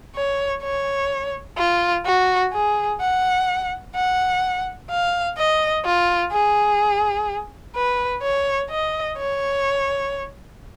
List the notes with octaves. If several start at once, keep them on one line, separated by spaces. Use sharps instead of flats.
C#5
C#5
F4
F#4
G#4
F#5
F#5
F5
D#5
F4
G#4
B4
C#5
D#5
C#5